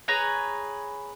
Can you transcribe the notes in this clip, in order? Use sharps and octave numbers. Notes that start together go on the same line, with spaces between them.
G#4 B4 C#5 A#5